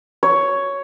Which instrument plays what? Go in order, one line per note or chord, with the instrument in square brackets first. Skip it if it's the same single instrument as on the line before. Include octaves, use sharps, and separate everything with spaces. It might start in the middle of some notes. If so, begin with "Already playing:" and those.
[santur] C#5